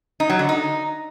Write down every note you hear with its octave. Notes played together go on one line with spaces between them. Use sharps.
D#4
F#3
D3
D#4